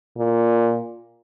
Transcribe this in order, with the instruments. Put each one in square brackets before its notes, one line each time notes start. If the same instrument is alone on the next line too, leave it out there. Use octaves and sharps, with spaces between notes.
[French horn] A#2